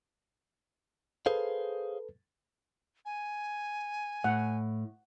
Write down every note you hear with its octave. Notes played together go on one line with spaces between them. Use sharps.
G#4 A4 B4 C5 F5
G#5
A2 F#5